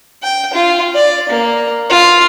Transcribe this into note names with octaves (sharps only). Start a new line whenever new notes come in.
G5
F4
D5
A#3
F4